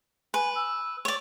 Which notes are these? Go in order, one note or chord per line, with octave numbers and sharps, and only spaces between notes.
B4 G#5
E6
C#5 D5